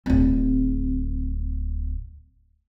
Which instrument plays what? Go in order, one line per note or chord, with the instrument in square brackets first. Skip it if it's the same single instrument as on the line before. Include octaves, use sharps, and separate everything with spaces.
[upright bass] D1 C4